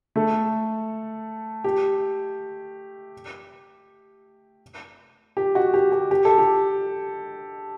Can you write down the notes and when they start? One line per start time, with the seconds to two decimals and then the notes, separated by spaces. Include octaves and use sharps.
0.16 A3 A4
1.64 G4
5.37 G4
5.55 F#4
5.74 G4
5.92 G4
6.11 G4
6.25 A4
6.38 G4